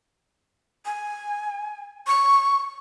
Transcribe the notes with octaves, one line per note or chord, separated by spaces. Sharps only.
G#5
C#6